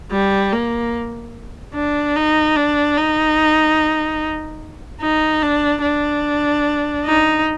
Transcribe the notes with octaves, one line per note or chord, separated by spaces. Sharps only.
G3
A#3
D4
D#4
D4
D#4
D#4
D4
D4
D#4